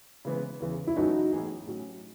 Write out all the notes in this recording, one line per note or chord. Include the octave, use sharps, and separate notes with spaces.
C#3 E3 G#3 B3
E2 C#3 E3
E4
F#2 E3 A3 C#4 D#4 F#4
A2 E3 B3 D#4 G#4
A2 F#3 C#4